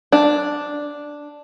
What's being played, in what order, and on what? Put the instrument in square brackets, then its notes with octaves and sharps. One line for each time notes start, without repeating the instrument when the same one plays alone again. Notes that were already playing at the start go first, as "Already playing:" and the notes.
[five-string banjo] D4